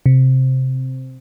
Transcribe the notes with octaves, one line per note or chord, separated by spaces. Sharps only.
C3